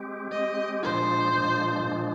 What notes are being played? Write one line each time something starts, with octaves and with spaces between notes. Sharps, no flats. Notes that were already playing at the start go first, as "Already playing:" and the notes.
Already playing: G#3 C4 G4
G#3 C4 G4 D#5
A#2 F3 G#3 D4 C5
A#2 F3 G#3 D4
A#2 F3 G#3 D4